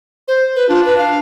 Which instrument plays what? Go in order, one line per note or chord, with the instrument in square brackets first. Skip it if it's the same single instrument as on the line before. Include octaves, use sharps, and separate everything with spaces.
[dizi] C5
B4
[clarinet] D4 [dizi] F4
[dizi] B4
F5